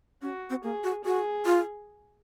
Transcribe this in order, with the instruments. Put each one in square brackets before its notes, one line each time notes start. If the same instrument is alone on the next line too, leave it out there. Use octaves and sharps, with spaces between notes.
[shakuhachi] C#4 [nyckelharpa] F#4
[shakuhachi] C4
[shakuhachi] A#3 [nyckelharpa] G#4
[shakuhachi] F#4
[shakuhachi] F#4 [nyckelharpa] G#4
[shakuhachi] F4